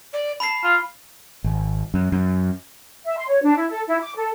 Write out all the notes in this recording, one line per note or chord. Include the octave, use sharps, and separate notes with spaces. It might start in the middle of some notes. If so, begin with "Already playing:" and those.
D5
A5 B5 C7
F4
G#1
F#2
F#2
E5
C6
C#5
D4
E4
A4
E4
D6
A4